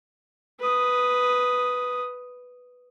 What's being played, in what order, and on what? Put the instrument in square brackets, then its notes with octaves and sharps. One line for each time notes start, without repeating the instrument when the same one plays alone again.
[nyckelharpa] B4 D#6